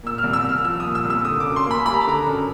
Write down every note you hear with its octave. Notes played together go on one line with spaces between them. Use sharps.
A#2 E6
F6
C2
E6
C2
F6
F3 E6
A#2 D#6
E6
C2
E6
D3 D#6
D6
F#2
C6
A#3 B5
G3 B5
A#5
A5
D3 A#5
F#2